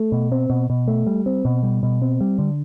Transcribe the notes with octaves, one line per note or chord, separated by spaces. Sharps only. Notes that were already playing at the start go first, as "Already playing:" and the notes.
Already playing: A3
B2
C4
B2
B2
A3
G3
C4
B2
G3
B2
C4
G3
D3